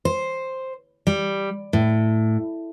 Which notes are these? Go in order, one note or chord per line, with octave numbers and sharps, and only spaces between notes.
C5
G3
A2